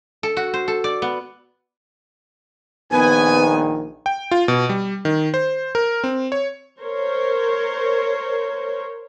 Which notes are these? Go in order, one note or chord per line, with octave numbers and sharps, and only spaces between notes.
A4
F#4
C5
A4
D5
B3
A#1 D#3 B3 B4 G#5
G5
F4
B2
G3
D#3
C5
A#4
C4
C#5
A#4 C5 C#5